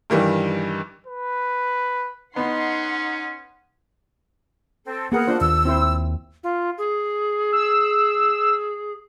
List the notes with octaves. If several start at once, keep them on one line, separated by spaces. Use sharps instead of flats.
G2 D#3 E3 G3
B4
B3 C#4 D#4 F#5 C6
C4 A4
A#3 B3 G#4 A#4 F#5
D4 F4 C5
D#2 E6
C4 E4 C5
F4
G#4
E6